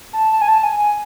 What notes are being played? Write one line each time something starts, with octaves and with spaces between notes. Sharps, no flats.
A5
A5
G#5
A5
G#5
G#5